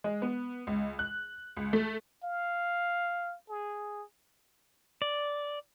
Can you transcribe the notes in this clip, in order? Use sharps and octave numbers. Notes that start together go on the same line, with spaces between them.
G#3
B3
C#2
F#6
C#2
A3
F5
G#4
D5